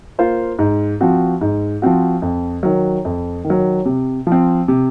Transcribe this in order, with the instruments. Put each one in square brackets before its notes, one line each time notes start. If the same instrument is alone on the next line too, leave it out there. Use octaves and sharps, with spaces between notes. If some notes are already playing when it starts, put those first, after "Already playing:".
[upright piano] A#3 F4 C5 F5
G#2
F3 C4 F#4
G#2
F3 C4 F#4
F2
D#3 F#3
F2
D#3
F#3
C3
F3
C4
C3